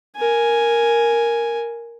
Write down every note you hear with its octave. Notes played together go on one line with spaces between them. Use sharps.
A#4 G#5